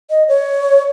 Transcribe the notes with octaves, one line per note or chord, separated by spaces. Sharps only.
D#5
C#5